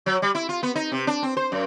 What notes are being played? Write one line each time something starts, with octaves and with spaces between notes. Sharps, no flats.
F#3
G3
E4
F4
B3
D#4
C3
D4
C4
C5
F#2